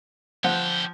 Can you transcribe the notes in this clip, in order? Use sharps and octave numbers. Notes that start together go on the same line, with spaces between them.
D3 F3 G4 F#5